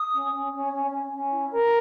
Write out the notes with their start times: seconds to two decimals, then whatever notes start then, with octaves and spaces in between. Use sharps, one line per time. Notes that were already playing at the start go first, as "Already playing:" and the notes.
Already playing: D#6
0.13 C#4
0.33 C#4
0.53 C#4
0.72 C#4
0.91 C#4
1.11 C#4
1.30 E4
1.50 A#4